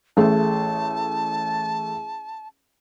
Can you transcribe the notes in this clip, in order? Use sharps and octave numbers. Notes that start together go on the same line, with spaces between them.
A1 A3 G#4 A5